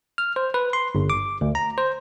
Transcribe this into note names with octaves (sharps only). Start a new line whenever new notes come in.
F6
C5
B4
C6
G1
D6
D2
A#5
C5